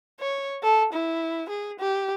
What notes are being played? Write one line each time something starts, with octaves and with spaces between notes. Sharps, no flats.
C#5
A4
E4
G#4
G4